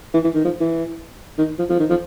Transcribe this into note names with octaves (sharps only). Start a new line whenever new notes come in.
E3
E3
D#3
F3
E3
D#3
F3
F3
D#3
F3